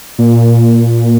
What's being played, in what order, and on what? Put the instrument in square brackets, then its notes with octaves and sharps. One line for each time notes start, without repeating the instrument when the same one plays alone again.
[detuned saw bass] A#2